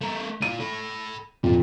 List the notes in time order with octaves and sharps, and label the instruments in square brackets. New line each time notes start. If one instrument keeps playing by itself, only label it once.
[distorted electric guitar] A3 A#4
[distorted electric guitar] A#2 F4 [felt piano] D#7
[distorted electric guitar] A4 B5
[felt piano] F2 [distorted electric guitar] A#2